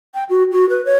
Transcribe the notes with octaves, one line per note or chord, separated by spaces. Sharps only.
G5
F#4
F#4
B4
C#5